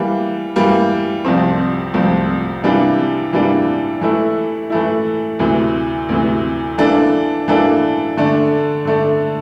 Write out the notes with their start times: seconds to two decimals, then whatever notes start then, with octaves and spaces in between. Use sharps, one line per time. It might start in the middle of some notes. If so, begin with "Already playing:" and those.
Already playing: E3 G3 A#3
0.56 E3 G3 A#3
1.25 C2 C3 F3 C4
1.94 C2 C3 F3 C4
2.63 C3 E3 G3 A#3 D4
3.33 C3 E3 G3 A#3 D4
4.01 E3 A3 E4
4.70 E3 A3 E4
5.39 D2 C3 E3
6.09 D2 C3 E3
6.78 E3 A#3 D4 A4
7.48 E3 A#3 D4 A4
8.17 D3 A3 D4
8.85 D3 A3 D4